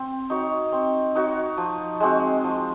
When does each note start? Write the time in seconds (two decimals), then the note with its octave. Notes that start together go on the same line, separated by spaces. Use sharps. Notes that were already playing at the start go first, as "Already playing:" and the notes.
Already playing: C4
0.30 D#4 F#4 C#5
0.72 C4
1.15 D#4 F#4 C#5
1.58 F3
2.00 G#3 C4 F#4
2.44 F3